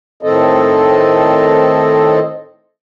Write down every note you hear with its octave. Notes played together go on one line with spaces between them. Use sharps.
A2 D#3 C4 A4 D#5